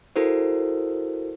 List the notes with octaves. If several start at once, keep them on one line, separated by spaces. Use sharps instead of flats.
E4 F#4 A4 A#4 C5